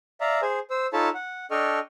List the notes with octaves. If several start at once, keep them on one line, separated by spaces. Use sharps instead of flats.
D5 E5 F5 A#5
G#4 C5 G#5
C5 E6
D#4 F4 A4 C#5 A5 B5
F#5
D4 A4 D#5 G5 C#6 F6